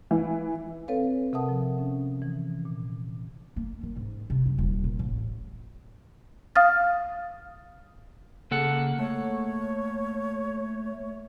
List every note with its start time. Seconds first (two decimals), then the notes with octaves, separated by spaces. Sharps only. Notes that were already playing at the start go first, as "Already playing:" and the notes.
0.11 E3
0.88 C4 A4 B4 C#5 F5
1.33 C3 A#4 E5 F#5 A5 D#6
1.49 F3
1.78 C#4
2.21 D#3 E3
2.65 A#2
3.56 A#3
3.83 D#3
3.97 G#2
4.30 C3
4.46 F#2
4.58 D#1
4.84 A#2
4.99 A1
6.56 F5 D#6 F6 A6
8.51 C#3 A#3 A4 F#5
8.99 A3 C#5